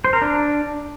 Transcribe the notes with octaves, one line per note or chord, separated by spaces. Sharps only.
C5
A#4
D4